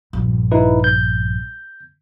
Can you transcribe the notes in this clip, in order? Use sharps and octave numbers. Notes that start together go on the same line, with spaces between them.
A#1 G2
D#4 E4 B4
G6